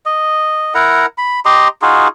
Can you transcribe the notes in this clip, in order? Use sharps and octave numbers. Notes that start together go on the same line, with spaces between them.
D#5
E4 A#4 F#5 A#5
B5
G4 D#5 A#5 C6
D#4 F4 F#4 G#4